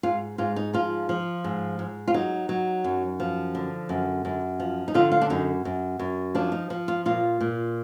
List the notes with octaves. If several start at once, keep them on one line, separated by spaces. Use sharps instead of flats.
G#2 F4
G#2 F4
D#4
F3 F4
F3
G#2
G#2
F4
F#3 D#4
F#3
F#2
F3
D3
F#2
F#2
F3
D#4
D3 F4
F4
D4
F#2 D#4
F#2
F#2
F3 D4
D#4
F3
F4
A#2 F4
A#2